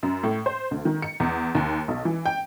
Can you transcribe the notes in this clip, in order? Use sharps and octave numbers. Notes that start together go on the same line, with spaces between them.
F#2
A2
C5
D2
D#3
C#7
E2
D#2
B1
E3
G5